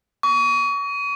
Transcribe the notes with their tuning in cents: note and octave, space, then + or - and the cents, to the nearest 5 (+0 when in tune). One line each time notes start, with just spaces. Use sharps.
C#6 +35